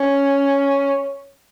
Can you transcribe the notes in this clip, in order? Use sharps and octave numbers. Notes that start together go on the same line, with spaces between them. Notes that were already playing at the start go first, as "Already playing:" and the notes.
Already playing: C#4